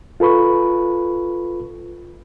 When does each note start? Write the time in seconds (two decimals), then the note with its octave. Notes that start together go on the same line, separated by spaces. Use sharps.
0.20 F4 A4 B4 B5 C#6